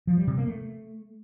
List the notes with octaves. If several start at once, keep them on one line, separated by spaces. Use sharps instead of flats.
F3
G3
C3
A#3
A3